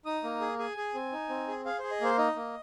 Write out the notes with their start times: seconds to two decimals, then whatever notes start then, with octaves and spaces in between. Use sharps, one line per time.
0.06 D#4 D#6
0.24 A#3
0.41 G#4
0.59 G#4 G#5
0.77 G#4
0.94 C4
1.12 D#4
1.29 C4
1.48 G#4
1.65 G#4 F5
1.79 G#4 C5
1.91 D#5
2.01 A#3 C5
2.18 D#4 D#5
2.36 A#3